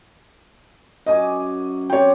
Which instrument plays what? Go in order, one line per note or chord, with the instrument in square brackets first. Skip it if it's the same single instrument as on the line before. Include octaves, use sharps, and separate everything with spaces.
[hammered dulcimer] F#2 G#5 D6 [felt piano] D#5
[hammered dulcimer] C4 D5 [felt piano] C#5 G5